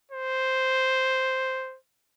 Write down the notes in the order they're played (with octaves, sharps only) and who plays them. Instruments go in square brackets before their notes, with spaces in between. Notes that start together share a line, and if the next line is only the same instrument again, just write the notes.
[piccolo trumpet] C5